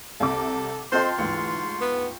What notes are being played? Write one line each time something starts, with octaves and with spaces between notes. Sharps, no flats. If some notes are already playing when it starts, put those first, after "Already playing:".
C2 C3 A4 D6
C4 F4 A4 C5 D#5 G5 C6
D2 G#2 E3 C#6
B3